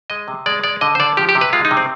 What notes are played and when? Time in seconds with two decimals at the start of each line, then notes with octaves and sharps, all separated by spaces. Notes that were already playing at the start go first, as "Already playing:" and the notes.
0.10 G#3 D#5
0.28 C3
0.46 G#3 D5
0.64 G#3 D5
0.81 D3 D#5
0.95 C5
1.00 D3 D5
1.17 F3 G4
1.29 G4
1.35 C3
1.41 B4
1.53 G#3 F4
1.65 D#4
1.71 C3
1.77 C4